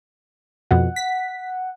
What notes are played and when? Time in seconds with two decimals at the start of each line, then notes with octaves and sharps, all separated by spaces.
0.71 F2 B2 F#5
0.96 B6